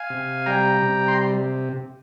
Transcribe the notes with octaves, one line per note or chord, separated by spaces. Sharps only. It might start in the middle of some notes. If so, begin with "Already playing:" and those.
Already playing: F5 G#5
C3
G3 G5 A#5
C3
C6